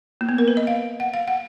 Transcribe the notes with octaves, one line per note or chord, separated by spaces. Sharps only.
A#3
B3
A#4
B4
D#5
F5
F#5
F5
F#5